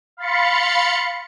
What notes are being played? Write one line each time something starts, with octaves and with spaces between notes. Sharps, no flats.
F5 B5 C6 A6 C#7